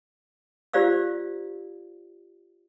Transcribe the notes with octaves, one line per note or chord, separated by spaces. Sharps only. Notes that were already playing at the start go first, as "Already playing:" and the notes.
F4 G4 C5 D5 F5 E6